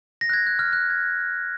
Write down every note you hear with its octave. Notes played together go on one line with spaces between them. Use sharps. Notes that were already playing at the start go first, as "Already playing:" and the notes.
A#6
F#6
G#6
F#6
F6
F#6
G#6